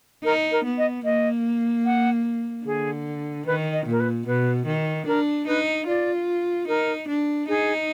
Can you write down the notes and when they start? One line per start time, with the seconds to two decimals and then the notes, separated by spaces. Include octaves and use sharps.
0.24 D#4 A#4
0.51 A#4
0.65 B3
0.78 D#5
1.04 A#3 D#5
1.85 F#5
2.66 D3 G#4
3.46 D#3 B4
3.73 D#5
3.86 A#2 A#4
4.00 B4
4.27 B2 B4
4.67 D#3
5.07 D4 A#4
5.47 D#4 B4
5.87 F4 D5
6.68 D#4 A#4
7.08 D4
7.48 D#4 G#4